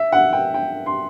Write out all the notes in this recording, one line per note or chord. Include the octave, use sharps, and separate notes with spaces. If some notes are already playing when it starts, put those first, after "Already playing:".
Already playing: E5
F#5
G5
G5
C6